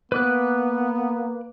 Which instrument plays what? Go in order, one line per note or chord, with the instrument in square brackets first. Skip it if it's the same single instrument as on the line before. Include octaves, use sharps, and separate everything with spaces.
[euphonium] A#3 [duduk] B3 [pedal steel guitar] B4 D6 F#6